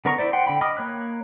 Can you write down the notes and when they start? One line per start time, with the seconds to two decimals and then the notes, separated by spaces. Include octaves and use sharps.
0.05 D3 B3 A#4 A#5 C#6
0.18 E4 C5 D5
0.33 F#5 G5 C6
0.47 D3 G5 B5
0.61 D#5 B5 D6 D#6 F6
0.77 A#3 C#5 B5 F#6